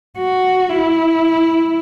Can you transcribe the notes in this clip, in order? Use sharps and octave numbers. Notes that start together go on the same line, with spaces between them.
F#4
E4